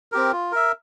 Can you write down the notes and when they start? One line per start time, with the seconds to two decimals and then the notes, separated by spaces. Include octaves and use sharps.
0.12 C4 G4 A#4
0.32 F4
0.52 A#4 E5